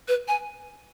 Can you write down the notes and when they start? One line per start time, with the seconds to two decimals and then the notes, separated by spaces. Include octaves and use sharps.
0.08 B4
0.28 G#5